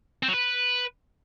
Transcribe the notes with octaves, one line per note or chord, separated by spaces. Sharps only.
C4
F#3
B4